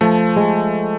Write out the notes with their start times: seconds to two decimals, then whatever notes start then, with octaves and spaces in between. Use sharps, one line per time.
0.01 F3 A3
0.36 G#3